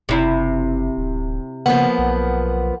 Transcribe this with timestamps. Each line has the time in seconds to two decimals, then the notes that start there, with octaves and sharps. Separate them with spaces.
0.09 F#1 C3 E4
0.97 D1
1.66 C#3 F3 A#3 B3 F#5
1.98 B1